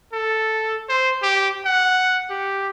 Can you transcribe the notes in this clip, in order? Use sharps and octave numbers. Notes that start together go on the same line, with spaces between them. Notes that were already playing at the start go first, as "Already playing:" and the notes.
A4
C5
G4
F#5
G4